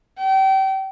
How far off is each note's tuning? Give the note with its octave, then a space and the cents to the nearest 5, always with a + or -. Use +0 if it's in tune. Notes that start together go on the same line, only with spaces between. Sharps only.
G5 -30